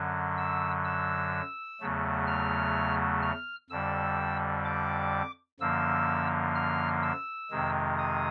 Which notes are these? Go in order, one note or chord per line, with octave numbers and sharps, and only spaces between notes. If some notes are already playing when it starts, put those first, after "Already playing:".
Already playing: F#2 D3 F#3
E6
E6
E2 C#3 F#3 A3
F6
F6
F2 D3 G3 E6
D6
F#2 D3 F3 A#3 E6
F6
E6
F2 C3 D#3 G#3
D#6